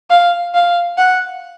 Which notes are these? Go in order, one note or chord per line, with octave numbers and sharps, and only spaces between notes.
F5
F5
F#5